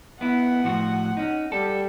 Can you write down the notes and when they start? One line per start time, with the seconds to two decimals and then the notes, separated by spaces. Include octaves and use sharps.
0.21 B3 E4 F#5
0.64 A2 F3 F#4
1.17 C#4 D#4
1.52 G3 A4